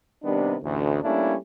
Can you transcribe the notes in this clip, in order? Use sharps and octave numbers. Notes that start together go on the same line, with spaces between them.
C3 D#3 G3 B3 D4
A1 D2
G3 A3 A#3 C#4 D4 E4